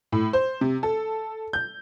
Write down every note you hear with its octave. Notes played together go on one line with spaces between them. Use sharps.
A2
C5
C3
A4
G6